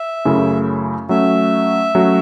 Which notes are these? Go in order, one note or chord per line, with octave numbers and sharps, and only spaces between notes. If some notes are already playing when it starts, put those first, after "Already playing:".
Already playing: E5
F#2 C#3 A3 C#4 E4
F#3 A3 C#4 E5
F#3 A3 C#4 F#4